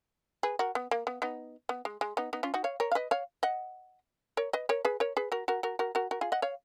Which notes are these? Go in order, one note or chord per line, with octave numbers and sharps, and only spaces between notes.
G#4 B4
F#4 A#4
B3
A#3
B3
B3 D#4
B3
G#3
G#3
B3 D#4
B3 D#4
C#4 F4
D#4 F#4
C#5 F5
A#4 C#5
F5
B4 D#5
C#5 F5
D#5 F#5
A#4 C#5
B4 D#5
A#4 C#5
G#4 B4
A#4 C#5
G#4 B4
F#4 A#4
F#4 A#4
F#4 A#4
F#4 A#4
F#4 A#4
F#4 A#4
F4 G#4
D#5 F#5
C#5 F5